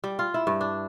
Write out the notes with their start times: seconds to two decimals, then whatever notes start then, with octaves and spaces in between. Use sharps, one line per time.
0.04 G3
0.19 F4
0.34 E4
0.47 G2
0.61 D4